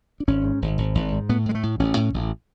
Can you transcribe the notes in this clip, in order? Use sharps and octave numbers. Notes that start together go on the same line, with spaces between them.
D4
G#1 C#4
G#2
G#1
G#1
G#1
G#2
A2 B3
A2 G#3
A3
A2
A1 C#4
A2
A1